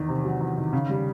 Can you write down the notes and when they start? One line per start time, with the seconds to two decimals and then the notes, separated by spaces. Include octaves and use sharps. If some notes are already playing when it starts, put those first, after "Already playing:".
Already playing: E2 D#3
0.09 C3
0.25 F#3
0.41 E2
0.57 D#3
0.73 C#3
0.89 G3